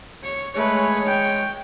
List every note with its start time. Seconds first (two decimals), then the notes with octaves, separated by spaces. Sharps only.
0.23 C#5
0.55 G#3 A3 B4 C#5
1.06 G5